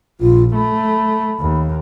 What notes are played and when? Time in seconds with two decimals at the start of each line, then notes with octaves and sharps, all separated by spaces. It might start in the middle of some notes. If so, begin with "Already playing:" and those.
0.21 A#1 F4
0.55 A3 B5
1.40 D#2